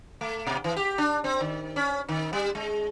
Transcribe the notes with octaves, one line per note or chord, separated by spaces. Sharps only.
A3
B2
E3
G4
D4
C4
D#3
C#4
D#3
G3
G#3